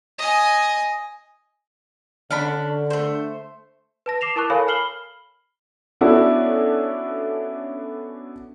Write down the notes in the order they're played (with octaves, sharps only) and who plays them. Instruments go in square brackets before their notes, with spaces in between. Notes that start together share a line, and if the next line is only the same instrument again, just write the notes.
[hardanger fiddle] D#5 G#5
[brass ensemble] D3 [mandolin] C#4 D4 B5
[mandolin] A3 C5
[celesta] B4 A5 A#6
D6 C7 E7 F7
E4 A#4 A5 C#6 D6 F#6
A4 A#4 C#5 F5 G#5 B5
B5 F6 C7 F#7 G7
[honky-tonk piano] B3 C#4 D4 E4 F#4 A4